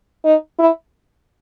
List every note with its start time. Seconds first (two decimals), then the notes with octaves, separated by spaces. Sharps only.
0.25 D#4
0.59 E4